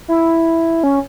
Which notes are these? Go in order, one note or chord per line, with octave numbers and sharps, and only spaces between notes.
E4
C#4